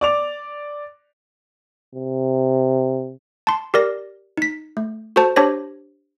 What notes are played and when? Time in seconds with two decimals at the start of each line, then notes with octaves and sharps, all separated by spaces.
0.01 D5 D6 F7
1.95 C3
3.47 A5 C6
3.74 G4 A#4 D5 A#6
4.37 D#4 B6
4.77 A3
5.16 F#4 A4 C5 A5
5.36 D4 G4 C5 C#5 A#6